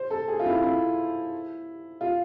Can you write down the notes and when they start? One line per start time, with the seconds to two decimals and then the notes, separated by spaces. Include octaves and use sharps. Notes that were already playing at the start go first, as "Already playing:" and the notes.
Already playing: C5
0.11 A4
0.28 G#4
0.39 F4
0.46 E4
0.63 E4
2.01 F4